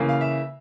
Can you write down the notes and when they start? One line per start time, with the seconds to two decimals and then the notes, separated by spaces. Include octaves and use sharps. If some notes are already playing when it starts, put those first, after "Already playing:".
Already playing: C#3 E3 A#3
0.09 F5
0.21 E5